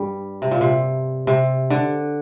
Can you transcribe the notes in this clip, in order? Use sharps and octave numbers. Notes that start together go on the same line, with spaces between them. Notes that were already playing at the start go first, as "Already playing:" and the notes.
Already playing: G2 G3
C3
A#2
C3
C3
D3